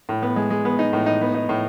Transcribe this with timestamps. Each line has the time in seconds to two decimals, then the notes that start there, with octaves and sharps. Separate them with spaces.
0.09 A2
0.22 B3
0.36 G#3
0.50 G#3
0.65 B3
0.79 D#4
0.93 A2
1.06 D#4
1.21 B3
1.34 D#4
1.49 A2